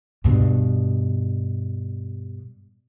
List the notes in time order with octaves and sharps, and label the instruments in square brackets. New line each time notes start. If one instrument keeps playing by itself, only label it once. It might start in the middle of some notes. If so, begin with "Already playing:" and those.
[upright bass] G2 B2